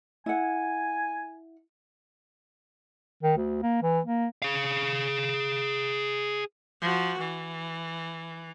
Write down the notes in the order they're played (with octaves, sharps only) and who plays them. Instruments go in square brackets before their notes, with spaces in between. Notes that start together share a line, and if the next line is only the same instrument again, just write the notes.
[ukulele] E4 F#5 [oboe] G#5
[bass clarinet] D#3
D2
A#3
E3
A#3
[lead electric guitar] G#4 F5
[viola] F3 F#4
E3